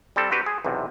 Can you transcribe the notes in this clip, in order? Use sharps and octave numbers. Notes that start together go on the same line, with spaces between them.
G3 C4 A4
C4 D4 F#4 G4 B4
G#4
B1 E2 C3